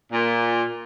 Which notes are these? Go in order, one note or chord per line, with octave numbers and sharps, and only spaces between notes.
A#2